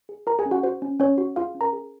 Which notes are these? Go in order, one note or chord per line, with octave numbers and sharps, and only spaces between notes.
G#4
F4 A#4 A#5
G#4 G#5
C#4
F#4 F#5
F#4 C5
C#4
C#4 C#5
F#4
F4 G#4 F5
C#4
A#4 A#5
G#4